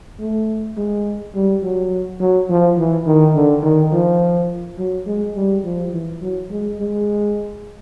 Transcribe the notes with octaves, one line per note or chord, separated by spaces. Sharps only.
A3
G#3
G3
F#3
F#3
F3
E3
D#3
D3
D#3
F3
F#3
G#3
G3
F3
E3
F#3
G#3
G#3